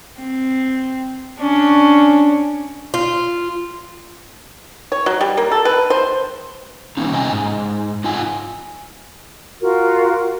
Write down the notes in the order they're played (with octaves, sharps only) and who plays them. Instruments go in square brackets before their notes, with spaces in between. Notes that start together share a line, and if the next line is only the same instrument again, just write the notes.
[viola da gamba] C4
C#4 D4
[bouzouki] F4
[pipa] C#5
F#3
G3
A#3
A4
B4
C5
[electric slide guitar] E3 A#3 C#4 D#4
C3 D#5 G5 G#5 A#5
G#2
D#4 F4 D#5 F#5 G#5
[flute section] F4 F#4 A#4